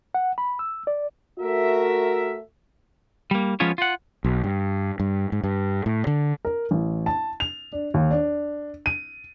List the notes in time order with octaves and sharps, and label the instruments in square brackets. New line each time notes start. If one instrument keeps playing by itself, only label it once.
[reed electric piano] F#5
B5
E6
D5
[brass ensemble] A3 F#4 A#4 E5
[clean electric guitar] G3 A#3
F3 G#3 B3 C#4 F4 C#5
F4 F#5
[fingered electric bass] B1
G2
G2
G#2
G2
A2
D3
[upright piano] A#4
A1
A5
F7
D4
D#2
D4
D#7